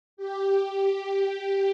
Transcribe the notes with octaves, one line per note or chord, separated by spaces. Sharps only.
G4